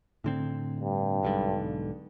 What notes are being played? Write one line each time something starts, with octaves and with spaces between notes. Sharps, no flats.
A2 D3 C4
G2
B1 G#2 D3